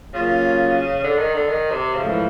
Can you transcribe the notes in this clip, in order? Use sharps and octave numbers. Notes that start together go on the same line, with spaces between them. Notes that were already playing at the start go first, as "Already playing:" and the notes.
C#3 F#3 A#3 C#4 F4
D3
D#3
D3
D#3
C3
G#2 C#3 F3 A3
E3